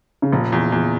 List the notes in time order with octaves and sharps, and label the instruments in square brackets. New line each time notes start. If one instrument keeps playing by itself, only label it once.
[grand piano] C#3
[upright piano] F1 [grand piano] A#2
[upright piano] E2
E2